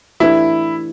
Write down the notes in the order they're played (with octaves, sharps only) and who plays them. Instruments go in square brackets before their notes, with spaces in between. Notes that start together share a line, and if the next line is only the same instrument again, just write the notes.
[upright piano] E3 A3 D4 G4 B4 [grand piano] E4